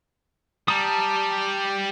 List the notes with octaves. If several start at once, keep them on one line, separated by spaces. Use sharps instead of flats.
G3 A5 A#5 D#6